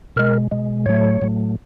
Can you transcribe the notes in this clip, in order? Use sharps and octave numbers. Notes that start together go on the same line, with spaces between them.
B2 G#3 A#4
B2 G#3
A2 F#3 A3 C#5
A2 F#3 A3